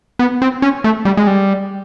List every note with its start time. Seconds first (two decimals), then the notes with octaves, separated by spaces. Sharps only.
0.19 B3
0.42 C4
0.62 C#4
0.84 A3
1.05 G3
1.17 G#3
1.27 G3